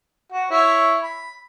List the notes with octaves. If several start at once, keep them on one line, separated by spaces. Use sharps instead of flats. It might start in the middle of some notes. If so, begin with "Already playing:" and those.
F#4
E4 C#5
B5